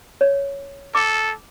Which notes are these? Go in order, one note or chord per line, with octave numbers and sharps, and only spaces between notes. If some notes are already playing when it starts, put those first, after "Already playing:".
C#5
A4 D6